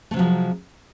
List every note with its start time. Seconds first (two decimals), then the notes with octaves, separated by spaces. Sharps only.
0.11 A3
0.14 C3
0.16 F#3
0.19 F3
0.21 G#3